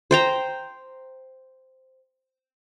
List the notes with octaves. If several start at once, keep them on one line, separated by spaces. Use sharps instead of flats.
C5 G5 A#5